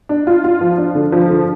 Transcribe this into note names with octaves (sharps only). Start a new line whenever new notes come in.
D4
F4
F4
F3
D4
D3
F3
D3